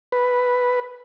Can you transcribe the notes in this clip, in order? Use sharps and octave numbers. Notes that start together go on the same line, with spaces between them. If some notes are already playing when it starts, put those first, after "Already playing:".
B4